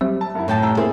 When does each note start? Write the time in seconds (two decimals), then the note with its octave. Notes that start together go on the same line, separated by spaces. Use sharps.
0.01 F#3 G3 C4 E5
0.21 A5
0.35 F#2 E4
0.48 A2 G5 A5
0.61 C2 A#5 E6
0.77 A#3 C4 E4 G#4